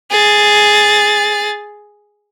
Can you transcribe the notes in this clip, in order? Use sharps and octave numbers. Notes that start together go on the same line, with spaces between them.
G#4 A6